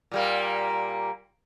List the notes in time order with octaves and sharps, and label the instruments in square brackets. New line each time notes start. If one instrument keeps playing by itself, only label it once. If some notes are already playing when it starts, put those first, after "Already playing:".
[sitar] A#2 G3 A#3